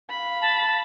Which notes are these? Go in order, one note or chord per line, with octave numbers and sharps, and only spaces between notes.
F5 B5
A5